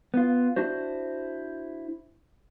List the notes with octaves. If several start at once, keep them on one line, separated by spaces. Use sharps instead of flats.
B3 F4
D4 E4 F#4 C5